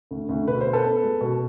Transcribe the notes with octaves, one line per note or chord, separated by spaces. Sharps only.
D2
D2
B2 B4
C5
B3
A4 B4
B3
G#3
B2